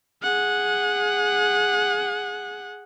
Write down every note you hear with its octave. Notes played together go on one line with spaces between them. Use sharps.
G#4 F#5